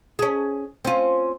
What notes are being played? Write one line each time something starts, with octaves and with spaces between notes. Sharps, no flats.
C#4 G#4
C4 C#4 F4